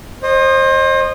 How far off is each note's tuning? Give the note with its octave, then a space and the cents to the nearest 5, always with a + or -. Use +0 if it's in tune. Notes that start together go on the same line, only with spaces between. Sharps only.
C5 +30 D#5 -20